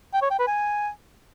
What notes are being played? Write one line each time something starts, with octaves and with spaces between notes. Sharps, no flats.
G5
C#5
G5
B4
G#5